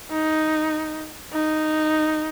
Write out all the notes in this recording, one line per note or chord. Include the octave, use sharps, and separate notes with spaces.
D#4
D#4